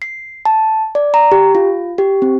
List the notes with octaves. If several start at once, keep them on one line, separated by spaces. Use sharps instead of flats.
C7
A5
D5
A#5
G4
F4
G4
C4